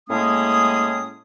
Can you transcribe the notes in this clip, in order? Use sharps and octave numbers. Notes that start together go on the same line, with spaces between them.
A2 G#3 A#3 C#4 G#4 D#6